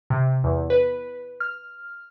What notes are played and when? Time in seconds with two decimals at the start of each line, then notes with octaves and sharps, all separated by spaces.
0.10 C3
0.44 E2
0.70 B4
1.40 F6